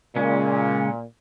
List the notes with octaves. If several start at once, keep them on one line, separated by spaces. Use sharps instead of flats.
A#2 C#3 G#3 C#4